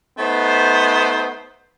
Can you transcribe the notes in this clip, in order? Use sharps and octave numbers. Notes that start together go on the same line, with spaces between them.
A3 B3 D#4 C5